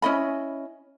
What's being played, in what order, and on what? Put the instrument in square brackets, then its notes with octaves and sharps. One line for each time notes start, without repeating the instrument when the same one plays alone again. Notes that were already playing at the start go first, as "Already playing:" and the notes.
[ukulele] C#4 E4 D#5 B5